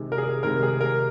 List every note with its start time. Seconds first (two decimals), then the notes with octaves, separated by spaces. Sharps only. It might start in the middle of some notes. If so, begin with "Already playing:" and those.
Already playing: C3 D#3 G#3
0.12 A#4
0.18 G#4
0.43 C3 D#3 G#3 A#4
0.63 G#4
0.81 A#4